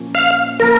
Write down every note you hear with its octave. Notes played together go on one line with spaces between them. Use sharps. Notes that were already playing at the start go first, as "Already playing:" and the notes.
Already playing: A#2 F3 A#3 C#4
F5
C#3 F3 A#3 A#4